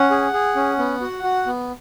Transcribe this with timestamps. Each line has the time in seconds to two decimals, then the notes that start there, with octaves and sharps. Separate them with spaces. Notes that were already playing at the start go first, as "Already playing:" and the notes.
Already playing: C#4 F#5
0.11 G#4
0.33 G#4
0.56 C#4
0.79 B3
1.01 F#4
1.23 F#4
1.46 B3